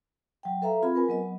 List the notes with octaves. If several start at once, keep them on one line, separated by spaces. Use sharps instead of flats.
F#3 G5
A4 B4 E5 F5 A#5
C4 F4 G#4 B5
A#4 B4 G#5
F#3 B3 D#5